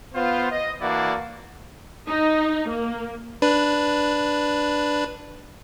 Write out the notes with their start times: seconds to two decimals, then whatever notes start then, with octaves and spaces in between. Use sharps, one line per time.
0.15 B3 F4 C5
0.51 D#5
0.81 E3 A#3 D4 E4 F#4 D5
2.06 D#4
2.68 A#3
3.42 D4 B4